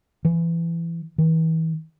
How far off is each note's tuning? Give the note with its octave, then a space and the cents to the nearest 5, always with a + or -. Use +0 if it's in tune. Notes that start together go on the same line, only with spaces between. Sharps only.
E3 +25
E3 -35